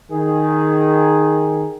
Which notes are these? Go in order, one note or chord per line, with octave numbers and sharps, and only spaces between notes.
D#3 G#4